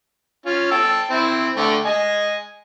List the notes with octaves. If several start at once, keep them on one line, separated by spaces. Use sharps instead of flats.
C#4 F4
G5 A5 E6
C4 E4
D3 A3 G5
D#5 G#5